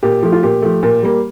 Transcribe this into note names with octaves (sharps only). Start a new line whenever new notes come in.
A#2 G4
F3 A3
F4
A#2 G4
F3 A3
A#2
G3 A#3